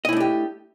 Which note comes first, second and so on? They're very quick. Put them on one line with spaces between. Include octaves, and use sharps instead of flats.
D#5 E4 A3 D4 G4